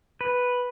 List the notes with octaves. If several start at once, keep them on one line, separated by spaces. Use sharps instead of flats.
B4